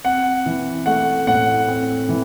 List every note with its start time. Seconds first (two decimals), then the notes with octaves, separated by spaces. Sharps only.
0.05 C4 F#5
0.46 E3
0.86 A3 F#5
1.27 A2 F#5
1.68 C4
2.09 E3